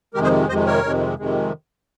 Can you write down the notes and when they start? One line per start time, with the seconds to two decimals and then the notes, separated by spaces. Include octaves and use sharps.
0.14 F2 C3 D#3 G#3 G4 A#4
0.23 G#4 C5
0.49 F2 C3 D#3 G#3 C5 D#5
0.66 A#4 C#5
0.83 F2 C3 D#3 G#3
1.18 F2 C3 D#3 G#3